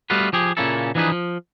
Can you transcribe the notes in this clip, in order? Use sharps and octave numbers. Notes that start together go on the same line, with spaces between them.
G3 A3 B3 F4 F#4 B4
F3 G4 G#4
A#2 C#3 A#3 C#4 E4 A4
E3 F3 D4 D#4 G#4 B4
F3